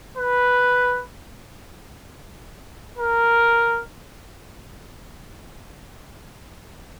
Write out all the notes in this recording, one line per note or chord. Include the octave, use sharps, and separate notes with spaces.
B4
A#4